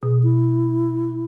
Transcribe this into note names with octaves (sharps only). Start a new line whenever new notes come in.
B2 G#4
E4